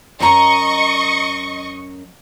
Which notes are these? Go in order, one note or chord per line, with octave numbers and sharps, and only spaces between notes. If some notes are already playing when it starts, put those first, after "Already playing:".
F#2 D#5 A#5 C#6